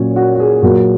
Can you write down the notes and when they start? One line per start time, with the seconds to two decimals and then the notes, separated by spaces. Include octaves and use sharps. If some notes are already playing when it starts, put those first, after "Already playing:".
Already playing: A#2 F#3 C#4 C#5
0.16 F#4
0.35 F#4
0.40 G#4
0.62 A#2 F#3 A#3 F#4